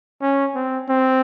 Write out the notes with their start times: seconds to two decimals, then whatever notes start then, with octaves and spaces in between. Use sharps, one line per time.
0.22 C#4
0.55 C4
0.89 C4